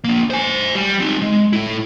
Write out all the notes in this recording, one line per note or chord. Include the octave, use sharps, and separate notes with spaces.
A#3 D4
C5 G#5
G3
C4 D#4
G#3
A2 E4